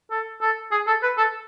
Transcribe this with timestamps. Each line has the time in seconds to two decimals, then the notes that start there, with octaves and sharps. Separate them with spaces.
0.11 A4
0.41 A4
0.72 G#4
0.87 A4
1.03 B4
1.18 A4